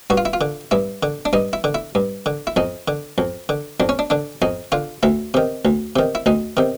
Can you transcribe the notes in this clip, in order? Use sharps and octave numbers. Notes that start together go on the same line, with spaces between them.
G2 F#4
F4
E4
F4
D3
G2 E4
D3
D4
G2 D#4
E4
D3
E4
G2
D3
E4
F2 D#4
D3
F2
D3
F2 D4
C#4
D4
D3 D4
F2 D#4
D3 F4
D2 E4
C3 D#3
D2
C3 D#3
E4
D2 D#4
C3 D#3